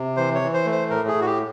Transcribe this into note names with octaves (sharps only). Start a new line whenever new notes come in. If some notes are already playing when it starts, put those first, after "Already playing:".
Already playing: C3
E3 C5
C#5
E3
C5
A3
C5
A2 A#4
G#4
A2
F#4
G4